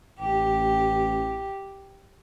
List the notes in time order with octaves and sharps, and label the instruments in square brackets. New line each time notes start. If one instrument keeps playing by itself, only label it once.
[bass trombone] A1 [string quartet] G4